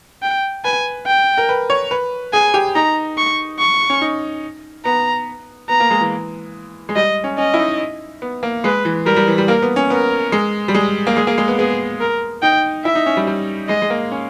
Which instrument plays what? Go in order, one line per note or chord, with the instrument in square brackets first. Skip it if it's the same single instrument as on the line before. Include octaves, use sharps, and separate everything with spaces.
[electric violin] G5
[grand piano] B4 [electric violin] G#5
[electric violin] G5
[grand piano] A#4
B4
C#5
B4
[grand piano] G#4 [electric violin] G#5
[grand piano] G4
[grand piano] D#4 [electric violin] A#5
[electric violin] C#6
C#6
[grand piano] C#4
D#4
[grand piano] B3 [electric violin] A#5
[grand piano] B3 [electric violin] A#5
[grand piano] A#3
G#3
E3
G#3
[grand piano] G3 [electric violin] D#5
[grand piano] C#4
[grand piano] C#4 [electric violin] D#5
[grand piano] E4
D#4
B3
A#3
[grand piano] G#3 [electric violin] B4
[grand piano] E3
[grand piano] G3 [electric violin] A#4
[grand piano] G3
E3
G3
[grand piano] A#3 [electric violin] A#4
[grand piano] B3
C#4
[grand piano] B3 [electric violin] A#4
[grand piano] G#3
G3
G#3
A#3
[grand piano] G#3 [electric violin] G#4
[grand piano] A#3
G#3
B3
[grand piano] B3 [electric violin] G#4
[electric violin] A#4
[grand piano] D#4 [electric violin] G5
[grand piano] E4 [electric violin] E5
[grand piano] D#4
C#4
G3
G3
[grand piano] G#3 [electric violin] D#5
[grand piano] G#3
A#3
C#4